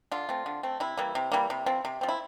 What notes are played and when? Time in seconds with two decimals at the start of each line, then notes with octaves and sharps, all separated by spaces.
0.12 D3 F4
0.29 A3 C4
0.46 D3
0.63 A3 C4
0.80 C3 E4
0.97 E3 G3 A#3
1.15 C3
1.32 E3 G3 A#3
1.50 C3
1.66 F3 C4
1.85 C3
2.01 F3 C4
2.09 E4